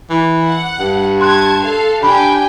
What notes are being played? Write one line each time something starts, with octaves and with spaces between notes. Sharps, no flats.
E3
F#5
G2
A5 C6 F#6 G#6
A4 F5
D4 G4 G5 G#5 B5